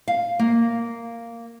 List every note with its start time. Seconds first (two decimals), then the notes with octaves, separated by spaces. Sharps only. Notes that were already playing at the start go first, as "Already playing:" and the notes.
0.08 F5
0.39 A#3